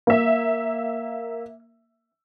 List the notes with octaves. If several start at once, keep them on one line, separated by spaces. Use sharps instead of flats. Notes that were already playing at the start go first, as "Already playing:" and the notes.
A#3 E5